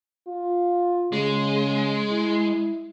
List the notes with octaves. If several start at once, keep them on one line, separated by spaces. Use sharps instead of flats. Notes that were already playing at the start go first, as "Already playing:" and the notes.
F4
C#3 G#3
E4